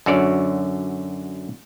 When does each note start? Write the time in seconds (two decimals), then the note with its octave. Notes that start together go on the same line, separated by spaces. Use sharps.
0.06 F#2 D3 F#4 C#5 D5